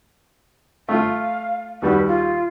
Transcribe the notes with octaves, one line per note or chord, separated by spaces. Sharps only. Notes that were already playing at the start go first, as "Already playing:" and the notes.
A3 F4 F5
D#2 G3 F#4 B4
F4